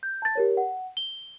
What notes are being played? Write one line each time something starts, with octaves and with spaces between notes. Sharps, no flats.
G6
A5 A6
G4 A#4 C#5
F#5
G7